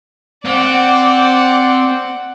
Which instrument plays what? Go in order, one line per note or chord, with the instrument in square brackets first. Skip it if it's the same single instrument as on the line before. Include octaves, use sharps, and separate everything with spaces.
[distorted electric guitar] C4 [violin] D5 [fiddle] F#5